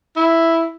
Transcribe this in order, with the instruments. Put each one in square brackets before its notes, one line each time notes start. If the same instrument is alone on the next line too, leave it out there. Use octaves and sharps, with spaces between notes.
[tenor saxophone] E4